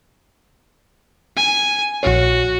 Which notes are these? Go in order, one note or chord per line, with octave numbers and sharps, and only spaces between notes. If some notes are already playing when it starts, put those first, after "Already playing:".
G#5
A#1 F#4 C#5